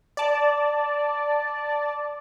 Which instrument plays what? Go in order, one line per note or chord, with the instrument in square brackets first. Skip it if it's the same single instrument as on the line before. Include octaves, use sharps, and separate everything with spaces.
[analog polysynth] D5 A5